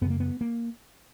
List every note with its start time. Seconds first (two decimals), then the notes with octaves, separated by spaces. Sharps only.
0.01 F#2 B3
0.05 C#3
0.10 A#3
0.20 B3
0.41 A#3